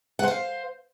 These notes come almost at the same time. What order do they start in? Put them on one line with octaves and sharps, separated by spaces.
F#5 C5 F5